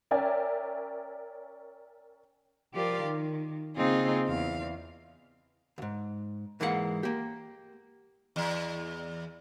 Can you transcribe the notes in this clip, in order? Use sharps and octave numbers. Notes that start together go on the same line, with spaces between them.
C#4 A#4 D5 E5 G5 G#5
F3 F4 G4 A#4 D5 F5
D#3
C#3 A#3 C4 D#4 F4 G#4
E2 F5
D2 G#2
G#2 E3 G#3 A#3 A#4 F#5
A#3 G4
E2